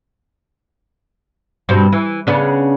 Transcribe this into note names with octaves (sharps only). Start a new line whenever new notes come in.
G2 B2 C4
E3
C#3 B3 D4